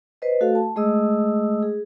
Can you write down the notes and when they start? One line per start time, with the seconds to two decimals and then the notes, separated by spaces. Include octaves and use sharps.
0.22 B4 C5 D#5
0.41 A3 F#4 A4 F5
0.55 A5
0.76 G#3 A3 G#4 D#5 D#6 E6
1.63 G#4